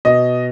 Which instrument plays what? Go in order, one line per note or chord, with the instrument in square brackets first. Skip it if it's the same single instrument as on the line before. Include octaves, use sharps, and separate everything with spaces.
[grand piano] B2 D#5